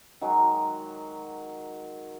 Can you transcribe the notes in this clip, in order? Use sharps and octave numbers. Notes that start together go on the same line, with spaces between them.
D#3 F#3 G#3